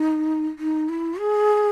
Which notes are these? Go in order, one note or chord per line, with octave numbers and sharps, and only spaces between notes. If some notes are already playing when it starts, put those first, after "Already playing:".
Already playing: D#4
D#4
E4
G#4